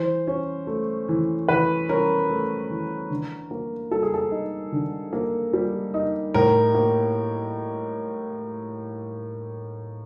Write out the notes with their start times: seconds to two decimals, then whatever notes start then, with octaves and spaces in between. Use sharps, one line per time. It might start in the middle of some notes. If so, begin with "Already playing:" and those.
Already playing: E3 C5
0.27 C#4
0.67 A3
1.09 E3
1.48 E3 B4
1.89 C#4 A#4
2.30 A3
2.70 E3
3.10 D3
3.51 A#3
3.91 G3 A4
4.03 G#4
4.14 A4
4.31 D#4
4.72 D3
5.13 A#3
5.53 G3
5.94 D#4
6.34 A2 A#4
6.74 A#3